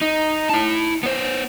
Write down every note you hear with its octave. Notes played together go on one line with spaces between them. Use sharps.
D#4
E4 A5
B3 C5